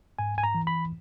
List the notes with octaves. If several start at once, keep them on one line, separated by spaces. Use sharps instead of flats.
G#2 G#5
G#5
A#5
E3
B5